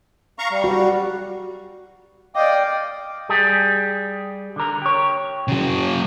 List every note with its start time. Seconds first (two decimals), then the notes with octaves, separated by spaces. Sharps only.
0.39 F5 A#5 C#6
0.52 G3
0.64 F#4
2.36 D5 D#5 F5 G5 D6
3.29 G3 G4 G#4
4.56 D3 A#4
4.82 G4 C#5
5.48 C#3 F#3